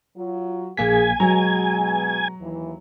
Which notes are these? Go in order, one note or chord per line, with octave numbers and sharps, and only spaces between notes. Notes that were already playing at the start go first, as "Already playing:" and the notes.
F#3 F4
A#1 A#3 G#4 G#5 B6
B2 F#3 G#3 A#5
D#2 E3